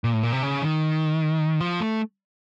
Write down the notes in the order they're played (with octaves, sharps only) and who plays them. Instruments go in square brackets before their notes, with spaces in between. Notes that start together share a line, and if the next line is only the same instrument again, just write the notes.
[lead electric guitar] A#2
A2
A#2
C3
C#3
D#3
F3
A3